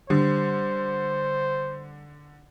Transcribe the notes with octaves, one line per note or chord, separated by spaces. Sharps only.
D3 G3 C5